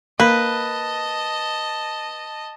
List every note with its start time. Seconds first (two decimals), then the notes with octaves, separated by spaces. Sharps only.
0.20 A#3 B4 D#5 A5